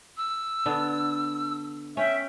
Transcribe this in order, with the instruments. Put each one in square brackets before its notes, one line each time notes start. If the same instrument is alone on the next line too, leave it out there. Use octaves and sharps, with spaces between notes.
[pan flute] E6
[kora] D3 B3 D4
[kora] C#4 G5 [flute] E5